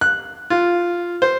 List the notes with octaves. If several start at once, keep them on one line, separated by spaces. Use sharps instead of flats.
F#6
F4
C5